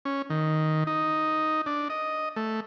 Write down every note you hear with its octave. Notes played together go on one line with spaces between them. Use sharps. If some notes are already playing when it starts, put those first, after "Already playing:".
C#4
D#3
D#4
D4
D#5
A3